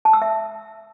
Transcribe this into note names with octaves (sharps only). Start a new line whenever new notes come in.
A5
E6
E5